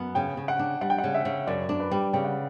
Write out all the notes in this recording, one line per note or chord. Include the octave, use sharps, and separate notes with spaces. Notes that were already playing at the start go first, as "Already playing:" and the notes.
Already playing: F#2 B3
C#3 G5
C#3
F#5
D4
G3 F#5
G5
F#5
C#3
E5
C#3
F#2 D5
D4
B4
G3
C#3 G5
F#5